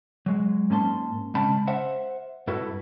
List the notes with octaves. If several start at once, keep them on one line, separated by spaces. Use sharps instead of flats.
F#3 G#3
G#2 A#3 C#4 A5 C6
C#3 G#3 C#4 G5 A5 B5
C5 E5 F#5
G2 E4 F#4 A4 B4